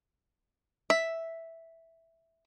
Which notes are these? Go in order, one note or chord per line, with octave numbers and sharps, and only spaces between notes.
E5